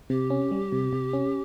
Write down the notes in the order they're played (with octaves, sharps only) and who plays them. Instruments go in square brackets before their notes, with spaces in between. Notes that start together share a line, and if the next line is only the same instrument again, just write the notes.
[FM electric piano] C3 [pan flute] G4
[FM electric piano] C#4
G3
C3
C3
C#4